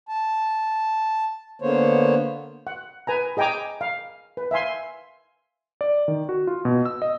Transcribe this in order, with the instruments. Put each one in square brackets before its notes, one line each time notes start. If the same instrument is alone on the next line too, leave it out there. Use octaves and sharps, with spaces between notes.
[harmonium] A5
D3 A#3 B3 C5 C#5
[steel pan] F#5
B4 G#5 A#5
G#4 D#5 G5 G#5 A#5 D6
F5
B4
E5 F5 G#5 C6
[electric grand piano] D5
D#3
F#4
F4
B2
E6
D#5